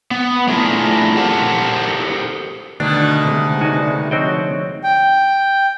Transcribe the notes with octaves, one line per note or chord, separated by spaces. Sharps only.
B3
A3 D4 E4 F4 G#4 A#4
G4 A4 A#4 C5 F#5 A5
B2 D3 D#3 A3 D4
C3 G#3
D#4 F#4 B4 D5 G#5
F3 C4 F#4 C#5 D#5 G5
G5